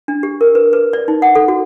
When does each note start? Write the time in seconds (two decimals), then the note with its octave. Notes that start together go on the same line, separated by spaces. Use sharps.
0.08 D4
0.23 G4
0.41 A#4
0.55 B4
0.73 B4
0.93 D5
1.08 D#4
1.22 F#5
1.35 A4
1.48 F#4